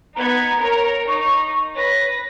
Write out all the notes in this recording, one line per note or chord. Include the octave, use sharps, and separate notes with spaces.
B3 D#4 A#5 G#6
A#4 C#5
D#4 C#6
B4 C#5 A#6